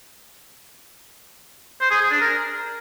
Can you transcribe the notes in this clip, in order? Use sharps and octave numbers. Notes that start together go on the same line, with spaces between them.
C5
G#4
G#4
D4
A#4